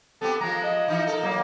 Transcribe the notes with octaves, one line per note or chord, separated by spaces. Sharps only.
B3 C4 G4 A4
F3 G#3 A#5
D#5
E3 F3 D#4
A4 A#4
F#3 A#3